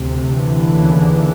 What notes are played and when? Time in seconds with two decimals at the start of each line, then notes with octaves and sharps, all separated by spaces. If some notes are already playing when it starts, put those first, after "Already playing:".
Already playing: D2 C3
0.25 D3 E3
0.66 D#2 C#3